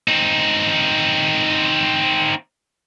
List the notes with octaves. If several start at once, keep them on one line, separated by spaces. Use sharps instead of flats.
C4 D#4